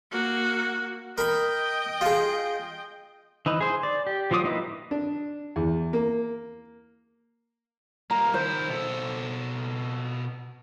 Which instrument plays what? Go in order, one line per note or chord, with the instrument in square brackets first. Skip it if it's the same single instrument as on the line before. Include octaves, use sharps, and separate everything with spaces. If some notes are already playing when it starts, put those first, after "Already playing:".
[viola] A#3 F#4
[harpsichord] A#4 B5 [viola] D#5 G5
[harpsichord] F4 G#4
[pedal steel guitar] E3 D#4 B4
G#4 C5
D5
G4
F3 F#3 F4 D6 D#6
A#3 D#4 E4 B4
[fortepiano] D4
E2
A#3
[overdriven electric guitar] G3 A#3 [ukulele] A#5
[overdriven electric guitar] D#3 E4 [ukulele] C5
[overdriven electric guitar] B2 A4